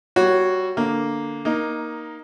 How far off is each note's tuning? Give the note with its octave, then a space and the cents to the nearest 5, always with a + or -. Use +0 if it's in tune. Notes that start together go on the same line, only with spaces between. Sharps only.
G3 -20 F#4 +0 C#5 +0
D3 +0 A#3 +0
A#3 +15 D#4 +0